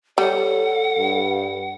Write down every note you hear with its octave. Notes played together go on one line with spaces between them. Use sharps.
G3 A4 C#5 F#5
G2